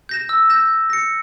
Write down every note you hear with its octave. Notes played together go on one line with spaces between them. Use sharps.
G6 A#6 E7
E6
G6 A#6 E7
G6
A#6 C#7